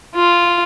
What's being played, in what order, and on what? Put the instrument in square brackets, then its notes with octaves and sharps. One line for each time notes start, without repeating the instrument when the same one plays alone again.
[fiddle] F4